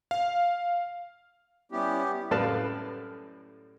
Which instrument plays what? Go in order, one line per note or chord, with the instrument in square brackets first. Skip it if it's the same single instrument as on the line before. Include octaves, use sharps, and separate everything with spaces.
[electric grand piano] F5
[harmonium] G3 C#4 E4 [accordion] B3 G4
[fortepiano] F#2 A2 G3 B4 F5 A5